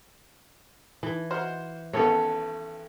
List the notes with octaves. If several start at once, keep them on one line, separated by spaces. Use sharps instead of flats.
E3
F#4 C5 F6
G#1 B3 C#4 A4 C#5